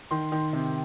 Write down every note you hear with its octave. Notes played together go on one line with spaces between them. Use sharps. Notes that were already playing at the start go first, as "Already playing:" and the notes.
D#3 C6
D#3
C3